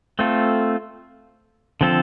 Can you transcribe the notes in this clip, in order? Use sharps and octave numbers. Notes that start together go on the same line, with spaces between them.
A3 C4 F4 A4
D3 F3 C4 F4 A4